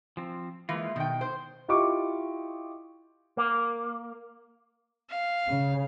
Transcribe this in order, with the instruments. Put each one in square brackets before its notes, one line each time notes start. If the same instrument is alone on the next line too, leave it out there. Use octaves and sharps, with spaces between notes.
[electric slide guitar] F3 C4
[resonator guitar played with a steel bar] E3 [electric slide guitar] G#3 A#3 F4
[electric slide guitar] B2 D#4 [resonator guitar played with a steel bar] D#3 G5
[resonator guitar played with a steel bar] C5
[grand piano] E4 F4 G4 D#5 C#6 D6
[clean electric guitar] A#3
[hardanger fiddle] F5
[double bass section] C#3